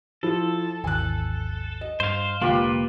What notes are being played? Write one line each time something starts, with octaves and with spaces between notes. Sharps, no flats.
F3 E4 F4 A4
G#1 D#2 E3 G#5 F#6
D#5
G2 C5 F5
F1 D3 G#3 A#3 F4 G4 B4